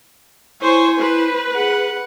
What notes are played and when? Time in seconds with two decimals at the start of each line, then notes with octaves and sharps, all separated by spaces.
0.62 E4 C5 C#5 G#5
1.00 B4 C5
1.56 G#4 F#5